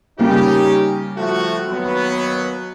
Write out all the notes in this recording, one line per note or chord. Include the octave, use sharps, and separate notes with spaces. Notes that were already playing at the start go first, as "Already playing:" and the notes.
C#3 G3 A#3 C#4 D#4 G4
F3 A3 F#4
D#2 F#3 B3